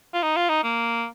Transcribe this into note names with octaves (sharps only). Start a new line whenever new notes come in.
F4
D#4
F4
D#4
A#3